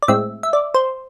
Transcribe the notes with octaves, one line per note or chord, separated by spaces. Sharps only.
D5
A2 G#3 C4 E5
E5
D5
C5